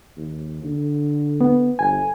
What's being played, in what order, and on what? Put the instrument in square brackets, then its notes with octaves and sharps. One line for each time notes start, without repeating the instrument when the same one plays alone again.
[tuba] D#2
D3
[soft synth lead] B3
[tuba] G1 [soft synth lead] G#5